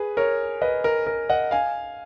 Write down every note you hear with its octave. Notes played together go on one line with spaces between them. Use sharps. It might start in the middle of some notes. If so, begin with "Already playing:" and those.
Already playing: G#4 B4
A#4 C#5
B4 D#5
A#4
A#4
D#5 F#5
F5 G#5